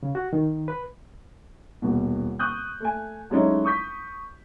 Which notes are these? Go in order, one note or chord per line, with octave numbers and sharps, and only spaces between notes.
C#3
F#4
D#3
B4
D#1 B2
C#6 D#6 F#6 G6
A3 G#5
F#3 G#3 A3 C#4 D#4 E4
C#6 D#6 G6 B6